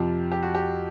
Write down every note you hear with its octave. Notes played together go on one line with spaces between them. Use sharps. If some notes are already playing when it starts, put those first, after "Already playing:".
Already playing: F2 C3 F3 G4
G4
F#4
G4